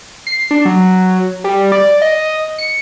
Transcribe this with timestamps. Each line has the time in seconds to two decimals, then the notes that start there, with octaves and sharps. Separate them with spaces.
0.27 C7
0.51 D4
0.65 F#3
1.44 G3
1.72 D5
2.02 D#5
2.58 C#7